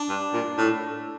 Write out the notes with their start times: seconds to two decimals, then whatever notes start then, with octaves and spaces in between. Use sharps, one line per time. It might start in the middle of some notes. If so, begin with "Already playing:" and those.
Already playing: D4
0.09 G2
0.33 A#2
0.58 A2